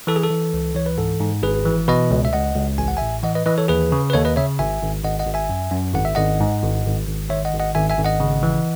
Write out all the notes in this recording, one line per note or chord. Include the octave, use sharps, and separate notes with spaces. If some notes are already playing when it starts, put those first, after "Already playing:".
E3 A4
G#4
A4
E3
C#2
E3 C#5
B4
G#2 A4
G#2
G#1 G#4 B4
E3
B2 B4 D#5
C#2
E5
C#2 D#5 F#5
C#2
A1 G#5
F#5
A2 E5 G#5
E3 D#5 F#5
B4 D#5
E3 B4 D#5
A4 C#5
D#2 G#4 B4
C#3
B4
D#2 A4 C#5
B4 D#5
C#3 C#5 E5
G#1 E5 G#5
G#1
G#1 D#5 F#5
D#5 F#5
G#1
E5 G#5
F#2
F#2
G#1 F#5
E5
G#1 D#5 F#5
G#2
G#1
G#1
G#1
D#3 C#5 E5
D#5 F#5
G#1
D#5 F#5
G#1 E5 G#5
E5 G#5
G#1
D#5 F#5
C#3
E3